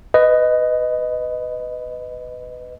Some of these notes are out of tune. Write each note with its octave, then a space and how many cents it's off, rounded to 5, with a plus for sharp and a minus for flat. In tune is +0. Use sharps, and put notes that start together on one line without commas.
B4 +20 D#5 +0